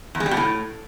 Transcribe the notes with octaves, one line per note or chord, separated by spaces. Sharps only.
E2
G#3
G3
B2
A2